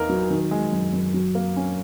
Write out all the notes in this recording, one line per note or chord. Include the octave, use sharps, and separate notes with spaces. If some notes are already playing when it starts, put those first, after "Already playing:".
Already playing: E2 A#3 D#4 A#4
F#3
D#3
G#3
F#2
F#2
F#3
A#3
C#4